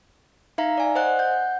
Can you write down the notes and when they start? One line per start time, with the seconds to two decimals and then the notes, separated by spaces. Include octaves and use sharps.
0.58 D#4 E5 F5 A#5
0.78 D5 G#5
0.95 C5 D#5 F#5 F#6
1.19 F#5 G6